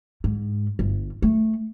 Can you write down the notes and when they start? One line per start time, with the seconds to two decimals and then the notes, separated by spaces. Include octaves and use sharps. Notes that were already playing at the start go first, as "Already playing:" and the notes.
0.24 G#2
0.79 G1
1.22 A3